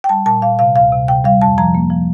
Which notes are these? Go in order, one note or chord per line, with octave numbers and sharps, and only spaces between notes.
G5
G3 A5
A#2 A5
A#2 F5
C3 F5
D2 F5
C3
C3 G5
G3 F5
F2 A5
F3 A#5
A#3
F3